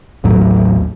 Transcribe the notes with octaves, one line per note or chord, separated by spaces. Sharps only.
A1 D#2 A2 F#3